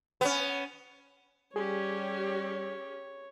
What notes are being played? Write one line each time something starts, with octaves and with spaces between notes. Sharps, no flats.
B3 C#4
G3 C#4 G4 G#4 C#5